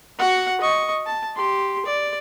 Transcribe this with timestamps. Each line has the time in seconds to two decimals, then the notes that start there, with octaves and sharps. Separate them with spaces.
0.19 F#4 F#5
0.61 D#5 C#6
1.06 A5
1.36 G4 C6
1.85 D5